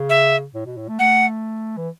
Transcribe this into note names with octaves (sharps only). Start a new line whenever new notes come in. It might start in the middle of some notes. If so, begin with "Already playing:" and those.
Already playing: C#3
E5
A2
B2
A2
A3
A3 F#5
E3